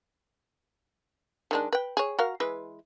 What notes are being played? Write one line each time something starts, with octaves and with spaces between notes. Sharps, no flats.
D#3 G#3 D4
B4 G5
G#4 C#5
F#4 A#4 F5
E3 G#3 B4